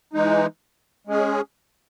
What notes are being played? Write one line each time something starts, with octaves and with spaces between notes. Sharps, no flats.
E3 G#3 D#4
G#3 C#4 G#4